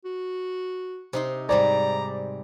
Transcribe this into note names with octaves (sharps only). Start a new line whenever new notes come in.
F#4
C3 D#4 C6
G#2 C3 G3 D5 A#5